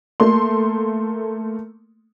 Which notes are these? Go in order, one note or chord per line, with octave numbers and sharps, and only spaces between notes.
A3 A#3 C6